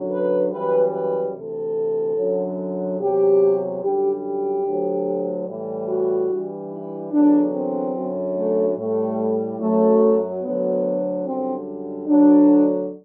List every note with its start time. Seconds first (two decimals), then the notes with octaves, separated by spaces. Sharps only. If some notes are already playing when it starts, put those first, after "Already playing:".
Already playing: F#2 D3 F#3
0.09 B4
0.51 F#2 E3 G3 B4
0.92 B4
1.33 D2 C3 E3 A4
2.16 F#2 D3 F#3
2.99 E2 C3 F#3 G4
3.82 F#2 D3 G3 G4
4.23 G4
4.64 D2 D3 F#3
5.47 A2 E3 G3
5.88 F#4
6.29 G2 E3 G3
6.70 E4
7.11 E2 D3 F#3 D4
7.52 C4
7.94 F#2 D3 F#3
8.35 A3
8.76 A2 G3 A3
9.59 F#2 F#3 A3
10.42 D2 D3 F#3 B3
11.23 F#2 D3 G3 C4
12.06 D2 D3 F#3 D4